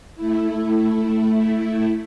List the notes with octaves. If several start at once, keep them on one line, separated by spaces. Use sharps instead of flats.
A3 E4